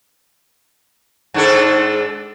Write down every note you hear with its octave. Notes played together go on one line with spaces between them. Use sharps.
G#2 D4 A4